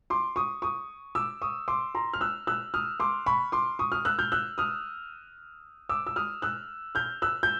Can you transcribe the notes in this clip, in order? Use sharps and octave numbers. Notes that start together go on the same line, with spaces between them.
C6 D6
C#6 D#6
C#6 D#6
D6 E6
C#6 D#6
C6 D6
A#5 C6
F6
E6 F#6
E6 F#6
D#6 F6
C6 D6
B5 C#6
C6 D6
C#6 D#6
D#6 F6
E6 F#6
F6 G6
E6 F#6
D#6 F6
D6 E6
E6
D#6 F6
E6 F#6
F6 G6
E6 F#6
G6